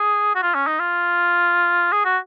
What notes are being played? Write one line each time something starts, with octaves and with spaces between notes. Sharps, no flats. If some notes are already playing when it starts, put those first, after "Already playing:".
Already playing: G#4
F#4
F4
C#4
D#4
F4
G#4
F#4